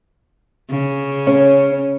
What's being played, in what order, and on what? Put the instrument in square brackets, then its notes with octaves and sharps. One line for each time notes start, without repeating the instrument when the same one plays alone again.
[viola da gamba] C#3
[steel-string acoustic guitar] C#4